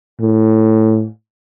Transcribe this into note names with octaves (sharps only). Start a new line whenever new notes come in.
A2